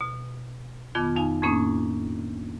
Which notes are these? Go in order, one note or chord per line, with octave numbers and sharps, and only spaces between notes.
B2
F2 D#3 B3 F4 D6 G#6
F2 D#4 F5 G#5
F2 A2 A#3 C#4 D4 D#6